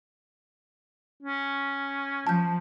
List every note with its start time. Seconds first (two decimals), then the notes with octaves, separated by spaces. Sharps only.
1.23 C#4
2.27 F3 A5 G6